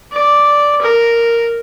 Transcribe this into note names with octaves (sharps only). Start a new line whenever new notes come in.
D5
A#4